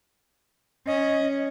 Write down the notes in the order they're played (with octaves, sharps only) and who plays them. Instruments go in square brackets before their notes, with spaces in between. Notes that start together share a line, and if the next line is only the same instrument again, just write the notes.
[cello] C#4 [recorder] D#5